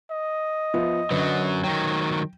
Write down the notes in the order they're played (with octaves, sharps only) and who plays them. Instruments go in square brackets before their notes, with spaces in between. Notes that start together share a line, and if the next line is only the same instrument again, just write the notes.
[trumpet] D#5
[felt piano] F3 B3 E5
[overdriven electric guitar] F#2 F#3 [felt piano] D3 B4
[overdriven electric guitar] D#3 F#3 [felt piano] G5